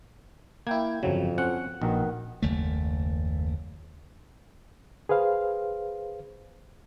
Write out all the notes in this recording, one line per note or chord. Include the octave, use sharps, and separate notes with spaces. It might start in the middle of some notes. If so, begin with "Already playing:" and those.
A#3 E4 G5 G#6
G1 F2 C#3 F3 F#3
C4 C#4 F#5
A#1 B2 D#3
F#1 D#2 A3
G#4 B4 C5 F5